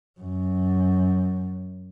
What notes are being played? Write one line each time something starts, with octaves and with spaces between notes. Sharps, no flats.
F#2